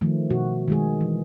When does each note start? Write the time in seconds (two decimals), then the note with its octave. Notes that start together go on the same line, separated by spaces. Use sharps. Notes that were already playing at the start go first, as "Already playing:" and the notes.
0.01 D#3 F3 A3
0.30 B2 F#4
0.68 D#3 G#3 G#4
1.01 E3